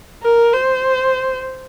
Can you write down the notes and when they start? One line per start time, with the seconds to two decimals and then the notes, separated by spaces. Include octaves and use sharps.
0.23 A#4
0.53 C5